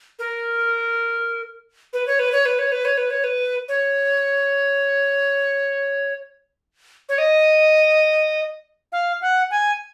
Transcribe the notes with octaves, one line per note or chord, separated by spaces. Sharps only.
A#4
B4
C#5
B4
C#5
B4
C#5
B4
C#5
B4
C#5
B4
C#5
C#5
D#5
F5
F#5
G#5